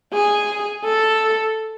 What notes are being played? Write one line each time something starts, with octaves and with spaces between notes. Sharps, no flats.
G#4
A4